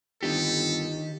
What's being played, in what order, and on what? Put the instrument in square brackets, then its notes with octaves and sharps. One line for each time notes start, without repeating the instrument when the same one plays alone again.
[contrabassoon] G1 [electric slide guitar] D#3 D#4 G4 [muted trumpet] A4